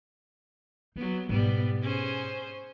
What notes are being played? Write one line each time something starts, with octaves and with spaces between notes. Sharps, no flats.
F#3 B3 D#4
G#2 B2 G3 B3
C#4 G#4 C5